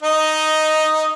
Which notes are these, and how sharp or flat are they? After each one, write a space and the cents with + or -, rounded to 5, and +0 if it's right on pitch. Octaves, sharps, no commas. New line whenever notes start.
D#4 +0 D#5 +0